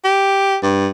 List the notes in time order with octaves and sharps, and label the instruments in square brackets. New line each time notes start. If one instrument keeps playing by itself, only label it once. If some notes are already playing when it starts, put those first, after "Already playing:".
[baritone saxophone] G4
G2